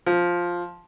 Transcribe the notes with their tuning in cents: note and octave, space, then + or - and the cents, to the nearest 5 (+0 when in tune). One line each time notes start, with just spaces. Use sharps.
F3 +5